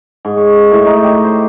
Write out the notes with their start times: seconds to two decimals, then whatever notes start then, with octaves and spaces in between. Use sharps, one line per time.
0.25 G#2
0.37 C#5
0.71 A2
0.86 D#4
1.04 G4
1.25 C5